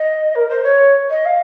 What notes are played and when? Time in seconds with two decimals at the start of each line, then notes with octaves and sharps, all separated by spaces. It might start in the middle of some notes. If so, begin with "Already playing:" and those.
Already playing: D#5
0.35 A#4
0.49 C5
0.63 C#5
1.10 D#5
1.25 F5